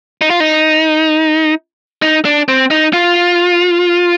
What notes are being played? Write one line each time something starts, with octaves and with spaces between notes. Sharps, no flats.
D#4
F4
D#4
D#4
D4
C4
D#4
F4